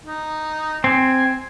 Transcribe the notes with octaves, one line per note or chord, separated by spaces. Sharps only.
D#4
C4 G#5